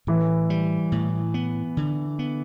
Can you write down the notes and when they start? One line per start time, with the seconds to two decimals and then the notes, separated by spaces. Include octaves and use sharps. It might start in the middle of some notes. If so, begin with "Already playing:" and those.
0.07 A2 E3
0.50 G3
0.92 A2
1.34 B3
1.77 D3
2.19 B3